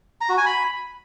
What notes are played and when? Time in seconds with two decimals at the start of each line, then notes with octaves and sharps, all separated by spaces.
0.21 A#5
0.29 F#4
0.38 G#5
0.46 B5